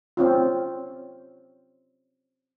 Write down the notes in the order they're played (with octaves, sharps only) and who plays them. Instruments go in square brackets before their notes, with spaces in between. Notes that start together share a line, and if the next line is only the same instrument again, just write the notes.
[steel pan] C4 C#4 F4